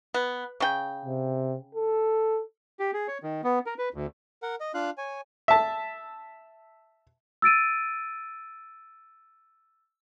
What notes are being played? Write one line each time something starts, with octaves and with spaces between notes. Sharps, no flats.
B3
C#3 G5
C3
A4
G4
G#4
C#5
D#3
B3
A#4
B4
D2
A#4 F#5
D#5
D4 F4 F5 F#6
C#5 G#5
E5 A5
E6 A6 D7 D#7